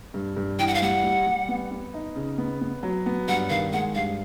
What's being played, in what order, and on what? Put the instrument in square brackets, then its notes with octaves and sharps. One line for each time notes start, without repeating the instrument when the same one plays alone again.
[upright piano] G2
G2
[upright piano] E3 [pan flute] G5
[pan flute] F#5
F5
[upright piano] G3 [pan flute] F#5
[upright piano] G3
G3
B3
B3
D#4
C#3
B3
B3
F#3
B3
[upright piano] G2 [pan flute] F#5
[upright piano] D#3 [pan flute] F5
[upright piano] G#3 [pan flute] F#5
[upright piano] G2 [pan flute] F5